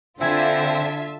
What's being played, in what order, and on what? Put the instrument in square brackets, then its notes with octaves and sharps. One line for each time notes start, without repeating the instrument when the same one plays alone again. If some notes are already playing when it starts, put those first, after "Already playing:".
[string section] D3 [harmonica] C4 [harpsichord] E4 G#5 B5 [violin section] F4 E5 A5